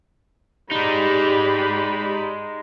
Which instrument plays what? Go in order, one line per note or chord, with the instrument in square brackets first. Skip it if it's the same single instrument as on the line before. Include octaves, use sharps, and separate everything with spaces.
[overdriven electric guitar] G#3 D#4 [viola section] G4 D5 B5